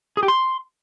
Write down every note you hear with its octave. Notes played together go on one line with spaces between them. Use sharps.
G#4
G4
C6